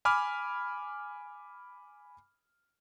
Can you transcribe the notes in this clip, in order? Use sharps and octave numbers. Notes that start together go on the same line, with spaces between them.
G#5 B5 D6 F6